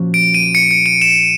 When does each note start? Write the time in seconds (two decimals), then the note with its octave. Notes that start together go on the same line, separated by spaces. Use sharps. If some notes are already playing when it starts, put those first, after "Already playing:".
Already playing: A#2 F3 A#3 C#4 F#4
0.14 D7
0.34 D#7
0.55 C#7
0.71 C#7
0.86 D#7
1.02 E7